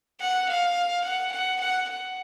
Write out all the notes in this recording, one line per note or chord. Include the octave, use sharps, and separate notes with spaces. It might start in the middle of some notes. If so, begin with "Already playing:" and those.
F#5
F5
F#5
F#5
F#5
F#5